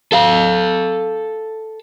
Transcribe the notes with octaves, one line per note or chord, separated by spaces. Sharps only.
A4 F5